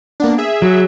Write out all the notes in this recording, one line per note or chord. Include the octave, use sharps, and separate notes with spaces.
A#3 B3 D4
G#4 E5
F#3